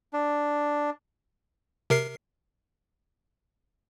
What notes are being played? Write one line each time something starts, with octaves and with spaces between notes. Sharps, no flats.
D4
C3 A#4 C7